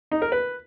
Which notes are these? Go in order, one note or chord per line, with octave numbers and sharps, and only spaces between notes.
D#4
A#4
B4